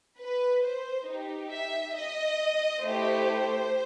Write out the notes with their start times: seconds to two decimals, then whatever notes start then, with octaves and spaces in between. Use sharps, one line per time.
0.19 B4
0.64 C5
1.08 D#4 G4
1.52 E5
1.96 D#5
2.84 A3 E4 G4 C5